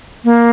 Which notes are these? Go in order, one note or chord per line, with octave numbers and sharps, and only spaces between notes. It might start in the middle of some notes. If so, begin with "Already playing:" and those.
A#3